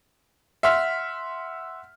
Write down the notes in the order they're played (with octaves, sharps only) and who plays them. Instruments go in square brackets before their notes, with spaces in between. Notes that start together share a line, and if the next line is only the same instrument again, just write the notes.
[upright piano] E5 F#5 C6 F6 B6